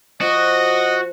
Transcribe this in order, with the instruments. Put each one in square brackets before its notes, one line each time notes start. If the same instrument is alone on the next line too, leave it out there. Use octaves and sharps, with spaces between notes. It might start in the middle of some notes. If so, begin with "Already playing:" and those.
[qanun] F3 [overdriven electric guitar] F#4 [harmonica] D#5